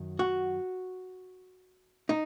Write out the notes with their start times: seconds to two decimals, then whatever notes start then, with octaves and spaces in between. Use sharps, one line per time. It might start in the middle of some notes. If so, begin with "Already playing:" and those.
Already playing: F#2 D#3 F#3
0.19 F#4
2.09 D#4